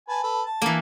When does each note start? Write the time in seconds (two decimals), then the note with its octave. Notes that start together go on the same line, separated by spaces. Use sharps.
0.09 B4 G#5 A5
0.23 A4 B4
0.45 A5
0.62 E3 A#3